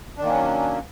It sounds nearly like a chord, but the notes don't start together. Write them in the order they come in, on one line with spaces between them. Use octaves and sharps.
D4 D#3 A#3 C#4 F#3